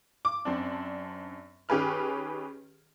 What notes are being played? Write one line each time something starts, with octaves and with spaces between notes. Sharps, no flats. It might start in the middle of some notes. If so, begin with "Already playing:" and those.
D6
F#2 C4 D4
D#3 C#4 G4 G#4 B4 F6